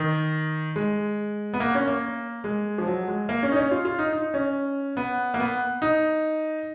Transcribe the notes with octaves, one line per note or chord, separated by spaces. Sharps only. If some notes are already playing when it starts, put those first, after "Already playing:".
Already playing: D#3
G#3
B3
A#3
C#4
A#3
G#3
F3
F#3
G#3
A#3
C#4
D#4
C#4
F4
F4
D#4
D#4
C#4
B3
A#3
B3
D#4